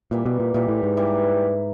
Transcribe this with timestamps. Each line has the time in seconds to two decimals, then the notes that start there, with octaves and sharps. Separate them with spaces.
0.11 A#2 E3 G3 A#3
0.26 B2
0.40 A#2
0.54 A#2 E3 G3 A#3
0.68 A2
0.83 G#2
0.97 E3 G3 A#3